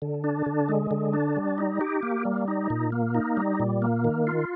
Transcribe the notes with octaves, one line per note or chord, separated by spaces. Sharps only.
D3
D4
D3
G#3
D3
D4
G3
D#4
G4
A#3
G3
D#4
A#2
A#3
D#4
G3
A#2
A#3
D#3
F4